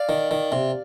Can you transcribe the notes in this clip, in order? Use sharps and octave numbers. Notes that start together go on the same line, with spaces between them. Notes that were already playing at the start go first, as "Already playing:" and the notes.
Already playing: D5 F5
D#3
D#3
C3